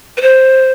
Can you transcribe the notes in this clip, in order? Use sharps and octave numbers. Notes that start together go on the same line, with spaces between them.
B4
C5